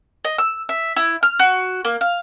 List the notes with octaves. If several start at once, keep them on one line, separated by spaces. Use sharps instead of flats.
D#5
E6
E5
E4
F6
F#4
A#3
F5